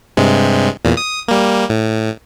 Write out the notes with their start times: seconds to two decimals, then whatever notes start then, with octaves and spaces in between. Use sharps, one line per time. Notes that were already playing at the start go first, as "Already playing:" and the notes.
0.17 G2 C3 G#3
0.85 E2 A#2
0.97 D#6
1.28 G3 A#3
1.69 A2